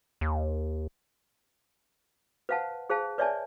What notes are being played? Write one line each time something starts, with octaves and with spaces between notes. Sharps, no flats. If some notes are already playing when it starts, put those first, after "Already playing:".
D#2
B4 C5 F5 F#5 A5
G#4 C5 F5 A5
B4 C#5 D5 E5 G#5 A5